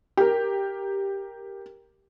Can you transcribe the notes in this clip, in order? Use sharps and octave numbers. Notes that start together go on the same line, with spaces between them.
G4 A#4